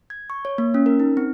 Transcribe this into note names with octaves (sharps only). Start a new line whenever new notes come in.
G#6
C#6
C#5
A#3
C#4
A#4
D#4
C4